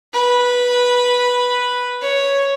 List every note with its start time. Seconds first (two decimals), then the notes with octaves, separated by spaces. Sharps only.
0.13 B4
2.02 C#5